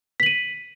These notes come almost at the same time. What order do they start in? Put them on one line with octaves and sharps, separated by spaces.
B6 F#7 D#7